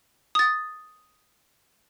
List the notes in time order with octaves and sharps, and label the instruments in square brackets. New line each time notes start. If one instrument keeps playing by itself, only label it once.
[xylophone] D#6 A6